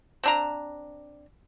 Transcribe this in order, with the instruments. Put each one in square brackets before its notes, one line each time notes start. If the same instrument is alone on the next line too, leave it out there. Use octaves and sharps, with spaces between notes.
[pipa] C4 D4 A#5